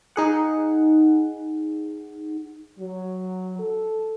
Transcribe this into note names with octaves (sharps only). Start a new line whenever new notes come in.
D#4 G#4 F#5
F#3
A4